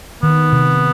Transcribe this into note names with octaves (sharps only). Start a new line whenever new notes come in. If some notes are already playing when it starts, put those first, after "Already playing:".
D#3 B3
C3